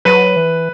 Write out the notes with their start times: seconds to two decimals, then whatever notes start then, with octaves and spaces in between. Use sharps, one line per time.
0.05 F#3 B4
0.36 E3